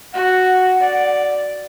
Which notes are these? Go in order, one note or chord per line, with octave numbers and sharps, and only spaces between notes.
F#4 F#5
D5